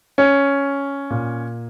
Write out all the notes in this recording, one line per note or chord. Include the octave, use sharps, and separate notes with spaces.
C#4
A#2